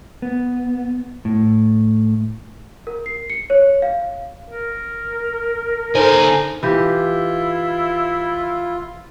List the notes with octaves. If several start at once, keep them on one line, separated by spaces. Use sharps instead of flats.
B3
A2
A#4
C7
C#7
C#5
F5
A#4
D3 D#4 A4 C5 G#5
E3 E4 F4 G4